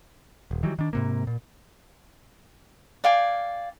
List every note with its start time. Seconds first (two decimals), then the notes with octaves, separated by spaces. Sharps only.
0.51 D#1
0.63 D#3 E3 F#3 G3
0.79 D#3 D4
0.93 G#2 C3 A#3
1.27 A#2
3.04 D5 F5 G5 G#5